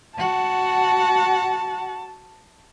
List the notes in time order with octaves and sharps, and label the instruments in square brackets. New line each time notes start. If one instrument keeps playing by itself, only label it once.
[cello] F#4 F#5 [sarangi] A5